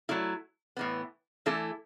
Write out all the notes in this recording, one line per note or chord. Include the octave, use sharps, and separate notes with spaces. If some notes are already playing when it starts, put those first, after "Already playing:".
F#3 A3 E4
A2 E3 B3
E3 A3 E4 A4